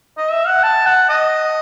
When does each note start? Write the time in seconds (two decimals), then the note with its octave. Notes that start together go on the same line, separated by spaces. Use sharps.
0.17 D#5
0.32 E5
0.47 F#5
0.63 A5
0.86 F#5
1.09 D#5